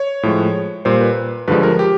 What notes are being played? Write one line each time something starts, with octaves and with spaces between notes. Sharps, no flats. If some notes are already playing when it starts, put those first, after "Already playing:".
Already playing: C#5
A2 F3 G#3
A#2 G3 C5
B4
G2 D3 F3 G#3 B4
A#4
G4